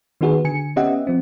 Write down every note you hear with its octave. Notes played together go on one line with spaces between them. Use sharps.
D#3 B3 D#4 F#4 G#4 B4
D3 G#5 C#7
B3 C#4 G4 D#5 E5 F#5
F3 C4